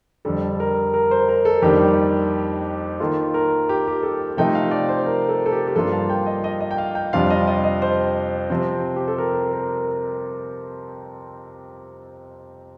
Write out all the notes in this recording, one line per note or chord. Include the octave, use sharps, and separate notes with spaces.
F2 D3 G3 A4
A#4
A#4
C5
A#4
A4
F2 D#3 G3 A#3 D4 G4
D#3 A#3 F4 A4
A#4
G4
G4
A4
C3 F3 A3 D#4 G5
F5
D5
C5
A#4
A4
A4
G4
G4
G2 F3 A#3 D4 F4 A4
F5
G5
D#5
D#5
D#5
G5
F5
G5
F2 C3 G3 D4 F4 F5
D#5
D#5
D#5
C5
C3 F3 C4
G4
A4
A#4
A#4